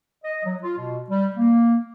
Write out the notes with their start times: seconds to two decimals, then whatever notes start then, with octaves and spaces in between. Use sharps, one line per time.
0.24 D#5
0.44 F#3
0.62 F4
0.77 B2
1.10 G3
1.36 A#3